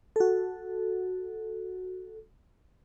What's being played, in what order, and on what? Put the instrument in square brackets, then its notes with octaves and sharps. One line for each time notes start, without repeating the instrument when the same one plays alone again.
[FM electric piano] F#4 A4